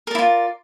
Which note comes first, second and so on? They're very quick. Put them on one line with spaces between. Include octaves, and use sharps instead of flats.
A#4 D5 E4 F4